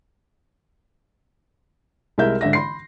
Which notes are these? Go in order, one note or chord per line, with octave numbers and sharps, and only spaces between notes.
C2 G#3 E4 A#4 E5 G6
G#1 D3 E5 A#6
B5 C6 C7